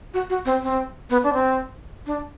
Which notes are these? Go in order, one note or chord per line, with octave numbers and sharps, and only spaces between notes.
F#4
F#4
C4
C4
B3
D4
C4
D4